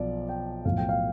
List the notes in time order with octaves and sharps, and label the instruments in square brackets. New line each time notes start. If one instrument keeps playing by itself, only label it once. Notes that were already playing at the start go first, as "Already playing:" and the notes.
Already playing: [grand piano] B1 F3 D5
G5
B1 A2 F3 F5
G5
F5